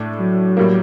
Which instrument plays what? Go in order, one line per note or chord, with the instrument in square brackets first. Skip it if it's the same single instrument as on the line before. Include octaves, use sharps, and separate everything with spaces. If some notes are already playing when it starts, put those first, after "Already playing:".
Already playing: [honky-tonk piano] A2 A3 D4
[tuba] F#3
[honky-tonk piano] A2 G3 A#3